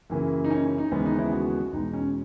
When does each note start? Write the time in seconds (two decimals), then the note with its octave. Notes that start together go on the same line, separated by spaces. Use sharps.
0.10 F#2 C#3 E3 A#3
0.44 D#4
0.50 C#4
0.64 C#4
0.78 D#4
0.91 D#2 C#3 E3 G#3 B3 C#4
1.06 D#4
1.19 E4
1.32 F#4
1.73 E2 B2 G#3 D#4
1.93 C#4